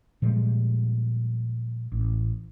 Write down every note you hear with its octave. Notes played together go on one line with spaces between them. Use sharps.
A#2 F3 G3 G#3
A1